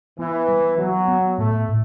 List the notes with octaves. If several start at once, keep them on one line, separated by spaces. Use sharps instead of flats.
E3 B3
G3
F#3 B3
B3
A2 A3
A2